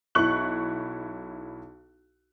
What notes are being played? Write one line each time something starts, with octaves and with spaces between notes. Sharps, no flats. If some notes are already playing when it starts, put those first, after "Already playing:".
B1 E4 C#6 F#6 F#7